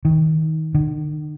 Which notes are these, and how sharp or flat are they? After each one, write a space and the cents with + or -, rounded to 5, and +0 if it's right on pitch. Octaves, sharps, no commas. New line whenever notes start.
D#3 +25
D#3 -45